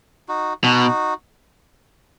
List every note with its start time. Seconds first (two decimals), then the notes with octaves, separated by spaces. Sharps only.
0.29 D#4 F#4
0.64 B2 D#4 F#4